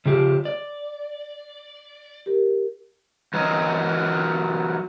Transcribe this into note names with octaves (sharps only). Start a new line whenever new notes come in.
C#3 F3 G4
D5
G4 A#4
E3 F#3 A#4 C#5 D#5